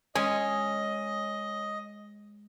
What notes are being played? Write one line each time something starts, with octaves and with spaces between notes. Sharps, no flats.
G#3 C#4 D#5